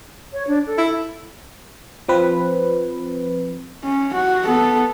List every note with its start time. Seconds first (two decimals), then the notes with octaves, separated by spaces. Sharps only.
0.33 C#5
0.47 D4
0.67 A4
0.78 E4
2.09 F3 C4 B4
3.84 C#4
4.13 F#4
4.44 B3 A4